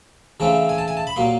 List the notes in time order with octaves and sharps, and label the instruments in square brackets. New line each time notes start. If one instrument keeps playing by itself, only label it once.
[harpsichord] C#3 E3 A3 C4
G#5
A5
G#5
A5
B5
A#2 F#3 A#3 C6